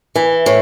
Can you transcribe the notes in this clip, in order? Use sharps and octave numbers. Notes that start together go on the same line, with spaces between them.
E3
A2